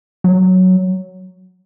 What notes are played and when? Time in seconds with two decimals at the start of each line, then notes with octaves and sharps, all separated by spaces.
0.24 F#3